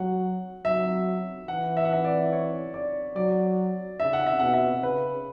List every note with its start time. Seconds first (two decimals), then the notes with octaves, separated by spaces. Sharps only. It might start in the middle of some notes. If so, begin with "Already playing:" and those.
Already playing: F#3 F#5
0.65 F#3 E5
1.48 E3 F#5
1.77 E5
1.85 F#5
1.93 E5
2.05 D5
2.32 C#5
2.74 D5
3.16 F#3 D5
4.00 C#3 E5
4.13 F#5
4.27 E5
4.39 B2 F#5
4.53 E5
4.83 C#3 B4